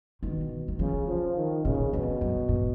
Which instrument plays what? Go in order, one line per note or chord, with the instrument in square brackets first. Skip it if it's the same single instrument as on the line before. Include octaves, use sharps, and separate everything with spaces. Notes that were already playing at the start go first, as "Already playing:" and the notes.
[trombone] B2 [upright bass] D#3
[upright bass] D#3
[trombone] C#3 [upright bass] F3
[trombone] F3
D#3
[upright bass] A#2 [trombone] C#3
[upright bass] F2 [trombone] B2
[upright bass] F#2
G#2